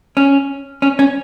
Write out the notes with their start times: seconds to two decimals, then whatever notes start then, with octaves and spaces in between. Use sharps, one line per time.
0.17 C#4
0.82 C#4
0.99 C#4